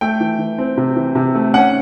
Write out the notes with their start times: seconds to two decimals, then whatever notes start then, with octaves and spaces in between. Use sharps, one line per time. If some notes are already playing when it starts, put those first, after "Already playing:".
0.01 A3 G5
0.20 E3
0.39 E3
0.59 C4
0.77 C3
0.96 E3
1.15 C3
1.35 A3
1.54 C#4 F#5